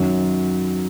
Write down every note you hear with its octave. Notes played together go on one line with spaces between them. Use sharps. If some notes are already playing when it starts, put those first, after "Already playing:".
Already playing: F#2 D#3 F#3